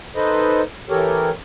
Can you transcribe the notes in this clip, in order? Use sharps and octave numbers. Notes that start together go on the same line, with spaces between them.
D#4 A4 B4 C5 D#5
E3 G4 A4 A#4 C#5